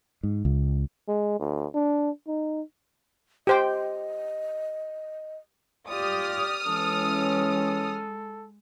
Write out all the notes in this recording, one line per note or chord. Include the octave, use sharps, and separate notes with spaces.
G#2
C#2
G#3
D2
D4
D#4
G4 C5 D#5 G5
F4 G4 D5 D#6 F6
E3 G#3 C#4 A4